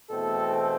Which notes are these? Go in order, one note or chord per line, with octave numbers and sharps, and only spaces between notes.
E2 B2 A3 C4 A4